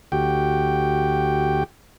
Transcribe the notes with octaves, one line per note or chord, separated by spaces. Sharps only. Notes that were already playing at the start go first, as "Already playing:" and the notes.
D2 F#4 G4 G5